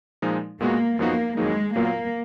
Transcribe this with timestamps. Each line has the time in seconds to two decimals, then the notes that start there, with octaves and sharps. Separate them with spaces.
0.22 A#2 F3 G#3 D#4
0.61 A#2 G#3 A#3 B3 F#4
0.99 F#2 F3 A#3 B3 D#4 F#4
1.37 F2 D#3 F#3 G#3 A#3 D#4
1.76 A#2 F#3 A#3 B3 F4 A#4